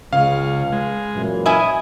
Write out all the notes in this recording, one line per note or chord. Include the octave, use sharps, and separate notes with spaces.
C#2 C#3 F5
G#3
F#2 A#2 E3
C#4 E4 D#5 G#5